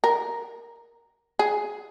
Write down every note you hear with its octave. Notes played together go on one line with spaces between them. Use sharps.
A#4
G#4